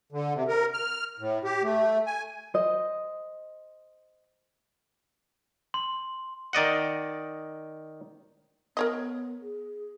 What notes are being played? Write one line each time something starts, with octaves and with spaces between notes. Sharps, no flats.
D3
C3
A#4
F6
A2
G4
A3
G#5
C5 D#5
C6
D#3 D5 D#5 F#5
B3 A#4 C#5 D#5
G#4